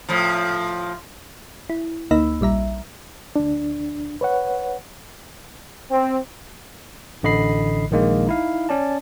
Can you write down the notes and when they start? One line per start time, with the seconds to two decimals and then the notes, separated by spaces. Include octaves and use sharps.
0.09 A2 F3
1.70 E4
2.11 D2 A#3 D#4 D#5 B5 E6
2.41 A#1 G3 E5 A#5
3.36 D2 D4
4.21 B4 C#5 F#5
5.91 C4
7.23 A1 D3 D#5 B5 C7
7.91 A#1 D#3 G#3 A#3
8.27 D#4 E4 F5
8.69 C#4 D5 A5